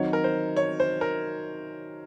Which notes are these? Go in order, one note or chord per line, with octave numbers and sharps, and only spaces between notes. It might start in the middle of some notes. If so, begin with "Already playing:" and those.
Already playing: D#3 F#3 C4 D#4 F#4 C#5
A#4
C5
C#5
C5
A#4